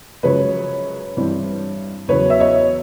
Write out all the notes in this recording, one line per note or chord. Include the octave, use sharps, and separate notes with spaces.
F#2 C#3 F3 G#3 B4 C#5
G2 E3 G3 C4 E4
E2 C#3 F#3 B3 B4 C#5
E5
C#5 D#5